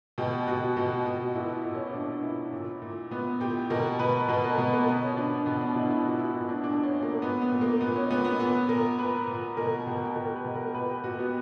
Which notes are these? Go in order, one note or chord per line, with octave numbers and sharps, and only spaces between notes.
B2 G4
B2 F#4
B2 F#4
B2 F#4
A#2 E4
A#2
C#4
A#2 D4
A#2 E4
A#2
A#2
A#2 B3
A#2 G4
B2 A#4
B2 B4
B2 B4
A#4
B2 B3
A#3
B2 B3
C#4
B2 D4
B2 B3
D4
B2 E4
E4
A#2 F#4
E4
A#2 E4
D4
A#2 D4
C#4
A#2
A#3
A#2 B3
B3
A#2
A#3
A#2 B3
C#4
A#2 B3
B3
A#2 B3
A#2 A#4
A#2 B4
A#2
B2 A#4
B2 G4
G4
B2 A#4
B4
B2
A#4
A#2 B4
G4
A#2 F#4
B3